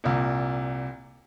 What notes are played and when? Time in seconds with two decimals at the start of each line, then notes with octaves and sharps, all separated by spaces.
0.04 C2 A#2